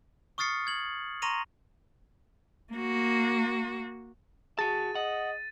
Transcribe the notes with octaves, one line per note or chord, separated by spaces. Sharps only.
C#6 D#6 F6 A6 C7 C#7
G#6 F#7
A#5 C6 C#6 A#6 D#7 F7
A#3 F#4
F#4 G#4 A5 A6 D#7
D#5 F#5